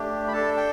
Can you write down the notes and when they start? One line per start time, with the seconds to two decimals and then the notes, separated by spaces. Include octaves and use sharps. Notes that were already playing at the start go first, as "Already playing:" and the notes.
Already playing: A3 D4 G4
0.28 B5
0.32 D4 A4 A5
0.57 G5